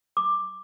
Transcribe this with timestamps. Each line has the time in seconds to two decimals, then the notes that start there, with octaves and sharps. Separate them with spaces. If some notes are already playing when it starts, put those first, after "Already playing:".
0.17 D6